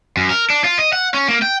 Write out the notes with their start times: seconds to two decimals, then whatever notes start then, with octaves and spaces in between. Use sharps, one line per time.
0.17 F#2
0.30 A#4
0.50 D4
0.65 F4
0.79 D#5
0.93 F#5
1.14 C#4
1.29 A#3
1.42 G5